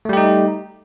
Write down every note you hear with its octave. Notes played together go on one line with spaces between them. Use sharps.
G3 A3 D#4 G4